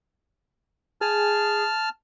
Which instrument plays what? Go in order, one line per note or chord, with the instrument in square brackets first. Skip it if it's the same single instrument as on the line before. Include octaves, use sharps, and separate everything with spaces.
[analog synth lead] G#4 [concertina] A5 F6